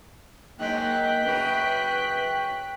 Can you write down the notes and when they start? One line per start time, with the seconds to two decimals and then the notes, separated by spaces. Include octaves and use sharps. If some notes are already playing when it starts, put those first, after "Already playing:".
0.59 G#2 F#3 G#3 A#3 G5 F#6 B6
1.24 F#2 C#3 F#4 B4